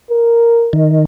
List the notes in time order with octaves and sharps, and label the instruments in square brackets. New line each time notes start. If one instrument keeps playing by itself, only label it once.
[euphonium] A#4
[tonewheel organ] D#3